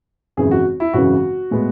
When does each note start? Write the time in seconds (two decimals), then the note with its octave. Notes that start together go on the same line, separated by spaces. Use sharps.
0.37 G#1 F#2 C#3 E3 G#4
0.51 F#4
0.80 E4
0.93 G#1 F#2 C#3 E3 F#4
1.51 A2 G#3 B3